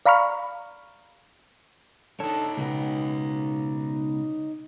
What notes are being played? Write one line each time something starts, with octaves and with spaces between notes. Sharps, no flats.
D5 F5 A#5 B5 C#6 F6
D4 D#4 A4 C#5
C#2 B2 B3